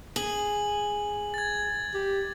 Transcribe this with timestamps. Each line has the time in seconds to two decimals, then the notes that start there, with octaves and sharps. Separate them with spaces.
0.16 G#4 F#7
1.34 G#6 A6
1.94 G4